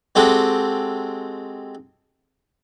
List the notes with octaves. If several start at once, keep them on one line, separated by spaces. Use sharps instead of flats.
G#3 C4 F#4 G4 A4